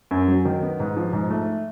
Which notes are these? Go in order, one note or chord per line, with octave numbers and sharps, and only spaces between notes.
F#2
F#3
D#3
B3
G#2
F3
G#2
A3